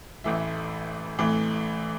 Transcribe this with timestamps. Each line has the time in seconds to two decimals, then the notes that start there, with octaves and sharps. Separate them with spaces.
0.24 A1 A2 E3 A3 E5
1.18 A1 A2 E3 A3